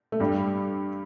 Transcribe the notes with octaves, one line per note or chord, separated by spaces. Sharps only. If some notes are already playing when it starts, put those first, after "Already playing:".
A3
G2 G3